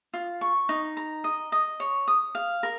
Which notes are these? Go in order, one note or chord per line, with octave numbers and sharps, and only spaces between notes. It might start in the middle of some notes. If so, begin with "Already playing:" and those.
F4
C#6
D#4
A#5
D#5
D#5
C#5
D#6
F5
A#4